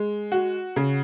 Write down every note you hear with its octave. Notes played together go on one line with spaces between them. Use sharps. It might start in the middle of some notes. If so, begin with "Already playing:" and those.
Already playing: G#3
F#4
C#3